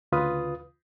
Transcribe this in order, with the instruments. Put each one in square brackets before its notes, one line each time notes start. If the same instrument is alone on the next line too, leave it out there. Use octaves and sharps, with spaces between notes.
[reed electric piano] D2 C#3 F4 B4 D#6